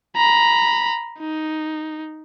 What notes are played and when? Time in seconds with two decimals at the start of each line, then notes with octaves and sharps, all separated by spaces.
0.16 A#5 B5
1.19 D#4